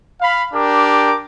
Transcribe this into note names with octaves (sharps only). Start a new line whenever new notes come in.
F5 B5
D4 G4 A#4 D6